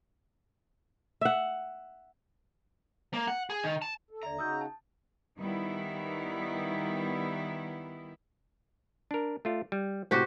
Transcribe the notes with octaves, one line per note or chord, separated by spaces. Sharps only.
E5 F#5
A#3
F#5
G#4
D#3
A5
A4
D#2 D3 D5 E5 A#5
C#3 D#4 F#4 D#6 E6 G6
A5
D#3 G3 B3 E4
D4 A#4
A3 F4 D5
G3
A2 C3 F#4 G4 C5